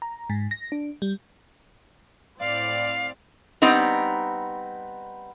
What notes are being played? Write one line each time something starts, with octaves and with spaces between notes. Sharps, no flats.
A#5
G#2
A#6
D4
G3
A2 C4 D5 F5
G3 B3 C4 D#4